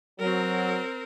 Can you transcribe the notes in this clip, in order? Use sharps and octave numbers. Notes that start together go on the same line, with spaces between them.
F#3 C4 A#4